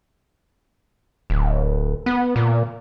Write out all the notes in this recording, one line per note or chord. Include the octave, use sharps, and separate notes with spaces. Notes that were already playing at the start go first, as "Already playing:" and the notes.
D1
B3
A#2